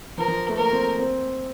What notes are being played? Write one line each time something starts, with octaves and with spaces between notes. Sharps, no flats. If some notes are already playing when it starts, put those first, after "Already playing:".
F3 A#4
F3
A3
A#3 A#4
C4
C4